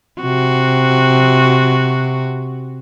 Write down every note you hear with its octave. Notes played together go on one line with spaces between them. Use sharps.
C3 F#4